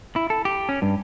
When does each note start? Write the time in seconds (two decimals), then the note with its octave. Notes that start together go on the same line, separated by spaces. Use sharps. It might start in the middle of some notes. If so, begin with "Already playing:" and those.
0.16 E4
0.30 A4
0.45 G4
0.69 C#4
0.82 G2